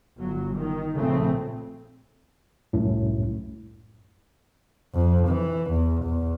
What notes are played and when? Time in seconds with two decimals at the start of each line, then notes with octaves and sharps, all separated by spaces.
0.18 G1 F#3
0.54 D#3
0.97 A#1 C#3 A3 C4
2.73 C2 F#2 A2
4.94 F2
5.28 E3
5.71 E2
6.04 E2